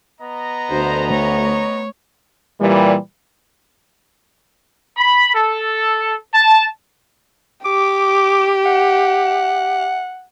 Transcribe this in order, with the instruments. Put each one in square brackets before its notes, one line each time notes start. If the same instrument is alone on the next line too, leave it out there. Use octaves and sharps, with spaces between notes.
[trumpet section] B3 D#5 A#5
[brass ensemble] D2 [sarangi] C5
[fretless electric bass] A3 [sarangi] C#5
[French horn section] A#2 E3 G3
[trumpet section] B5
A4
A5
[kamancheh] G4 [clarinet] D6
[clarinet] F#5